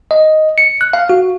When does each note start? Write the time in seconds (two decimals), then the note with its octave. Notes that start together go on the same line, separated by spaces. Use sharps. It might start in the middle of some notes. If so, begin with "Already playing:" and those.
0.11 D#5
0.58 C#7
0.81 F#6
0.93 F5
1.10 F#4